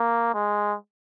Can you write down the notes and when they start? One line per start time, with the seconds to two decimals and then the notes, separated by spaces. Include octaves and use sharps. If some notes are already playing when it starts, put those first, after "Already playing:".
Already playing: A#3
0.34 G#3